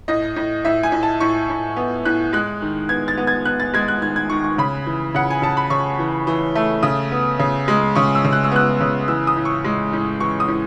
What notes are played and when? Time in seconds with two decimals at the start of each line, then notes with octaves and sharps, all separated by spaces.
0.08 A2 D#5
0.36 A2
0.65 A2 E5
0.83 G#5
0.92 A2
1.03 A5
1.20 A2 C#6
1.50 A2
1.76 B3
2.05 A2 F#6
2.33 G#3 F#6
2.62 D#3
2.89 B3 G#6
3.08 A6
3.18 B3
3.27 G#6
3.45 B3 F#6
3.60 A6
3.73 G#3 G#6
3.88 F#6
4.01 D#3 G#6
4.16 G#6
4.30 D#3 C#6
4.44 C#6
4.58 C#3 B5
4.86 E3
5.15 C#3 F#5
5.30 G#5
5.42 C#3 A5
5.57 B5
5.70 C#3 C#6
5.99 E3
6.27 E3
6.55 A3
6.83 C#3 D#6
7.11 B3
7.39 C#3
7.68 G#3
7.95 C#3 C#6
8.15 E6
8.24 C#3
8.33 F#6
8.44 E6
8.52 B3 F#6
8.81 C#3
9.08 E3 E6
9.27 D#6
9.37 A2
9.45 C#6
9.64 G#3
9.93 A2
10.20 E3 C#6
10.40 D#6
10.48 A2